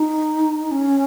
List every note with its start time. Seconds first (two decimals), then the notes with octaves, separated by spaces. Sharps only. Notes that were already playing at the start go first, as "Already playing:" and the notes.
Already playing: D#4
0.71 C#4